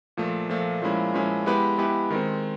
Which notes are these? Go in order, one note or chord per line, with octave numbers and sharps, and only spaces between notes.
A#2 F3 A3
A#2 F3 A3
A#2 F3 G#3 C#4 E4
A#2 F3 G#3 C#4 E4
G#3 B3 E4 G4 B4
G#3 B3 E4 G4 B4
D#3 G#3 C4